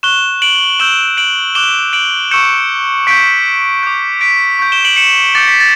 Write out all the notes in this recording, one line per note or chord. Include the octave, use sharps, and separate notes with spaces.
C#6 F#6 E7 G7
D7 F#7
C#6 E6 G6 E7 G7
D7 F#7
D6 F#6 E7 G7
D7 F#7
C#6 E6 G6 C#7 E7
C#6 G6 B6 D7
D6 G6
B6 D7
C#6 G6
E7 G7
D7 F#7
C#7 E7
D6 G6 A6 C#7
B6
A6